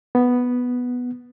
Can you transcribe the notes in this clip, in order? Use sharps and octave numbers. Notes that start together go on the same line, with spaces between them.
B3